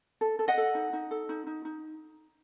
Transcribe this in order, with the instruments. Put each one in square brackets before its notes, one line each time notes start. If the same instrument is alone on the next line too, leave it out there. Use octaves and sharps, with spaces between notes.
[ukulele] A4
A4
D#5 F#5
A4
D#4
D#4
A4
D#4
D#4
D#4